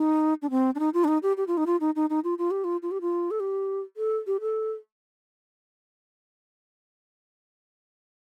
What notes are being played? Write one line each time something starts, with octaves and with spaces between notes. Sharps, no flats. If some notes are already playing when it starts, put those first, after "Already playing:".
Already playing: D#4
D4
C4
D4
D#4
F4
D4
D#4
G4
G4
F4
D#4
F4
D#4
D#4
D#4
F4
F4
G4
F4
F4
G4
F4
A4
G4
A4
G4
A4